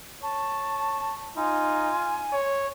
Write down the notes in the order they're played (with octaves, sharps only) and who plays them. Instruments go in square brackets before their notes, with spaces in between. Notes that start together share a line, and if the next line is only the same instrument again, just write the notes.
[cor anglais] C#5 [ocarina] A5
[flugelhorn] D#4 [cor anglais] F4 [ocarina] G#5
[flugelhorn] C#5